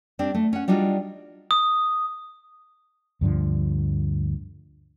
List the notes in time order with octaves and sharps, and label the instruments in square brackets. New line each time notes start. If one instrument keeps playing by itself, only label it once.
[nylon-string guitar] G3 C4 D4
A3
C#4 F#5
G3 D4 D#4 F4 F#4
[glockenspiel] D#6
[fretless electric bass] D2 G2 D3 F3